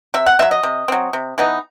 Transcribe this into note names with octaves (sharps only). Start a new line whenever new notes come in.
C3 E5
F#5
F#3 C4 E5
D#5
C3
F#3 C4
C3
E3 B3 D#4